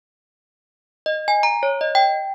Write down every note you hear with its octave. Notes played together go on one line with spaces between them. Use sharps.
D#5
G#5
A#5
C#5
D#5
G5